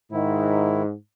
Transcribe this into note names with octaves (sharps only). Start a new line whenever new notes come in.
G#2 D#3 E4